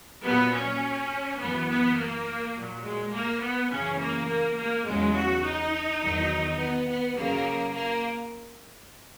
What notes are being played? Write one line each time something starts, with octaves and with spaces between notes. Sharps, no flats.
A#2 F#3 B3
C#4
F#2 E3 B3
B3
A#3
A#2 F#3
G#3
A#3
B3
F#2 C#3 E3 C#4
A#3
A#3
A#3
E2 C#3 F#3 G#3
F#4
D#4
E2 D#3 F#3
B3
B3
F#2 C#3 F#3 A#3
A#3